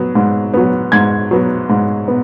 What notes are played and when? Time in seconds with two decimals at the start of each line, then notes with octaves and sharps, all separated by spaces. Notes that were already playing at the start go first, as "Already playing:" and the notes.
Already playing: F#3 B3
0.15 G#2
0.54 F#3 B3
0.92 G#2 G#6
1.31 F#3 B3
1.70 G#2
2.08 B3